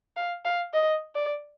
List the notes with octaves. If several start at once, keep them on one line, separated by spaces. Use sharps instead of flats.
F5
F5
D#5
D5